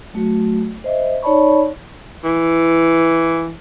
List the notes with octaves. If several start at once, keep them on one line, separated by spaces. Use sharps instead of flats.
F#3 A3 F#4
C5 D#5 E5
D#4 C#5 D5 A5 B5 C#6
E3